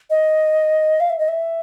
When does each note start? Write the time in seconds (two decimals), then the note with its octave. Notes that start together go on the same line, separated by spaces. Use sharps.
0.10 D#5
1.00 F5
1.10 E5
1.19 D#5
1.28 E5